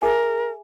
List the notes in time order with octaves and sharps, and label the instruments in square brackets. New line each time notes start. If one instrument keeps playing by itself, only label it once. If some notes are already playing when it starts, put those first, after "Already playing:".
[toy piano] G#4 E5 G#5 [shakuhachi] A#4